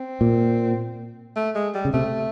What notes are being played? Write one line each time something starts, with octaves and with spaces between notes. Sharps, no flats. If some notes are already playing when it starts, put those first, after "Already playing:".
Already playing: C4
A#2
A3
G#3
G3
C#3
C3 A3